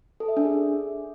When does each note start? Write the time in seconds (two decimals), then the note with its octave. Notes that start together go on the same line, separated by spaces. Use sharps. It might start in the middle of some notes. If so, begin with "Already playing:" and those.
0.20 A4
0.28 E5
0.37 D4
0.45 G#4